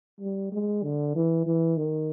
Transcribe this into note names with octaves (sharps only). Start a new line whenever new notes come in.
G3
G#3
D3
E3
E3
D#3